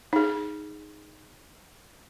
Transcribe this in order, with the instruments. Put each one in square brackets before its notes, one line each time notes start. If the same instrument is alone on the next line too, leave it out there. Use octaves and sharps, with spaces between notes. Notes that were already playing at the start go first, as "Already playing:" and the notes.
[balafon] D#4 G#4